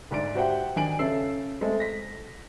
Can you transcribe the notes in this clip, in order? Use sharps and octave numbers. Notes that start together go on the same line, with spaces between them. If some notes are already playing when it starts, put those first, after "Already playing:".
D2 G#2 D5 D7
F#4 G4 C5 E5 F#5 G5
D#3 D4 G#5 D7 F#7
C#3 C#4 A4 E5 E6 C7
G#3 A3 C4 A4
A#6 B6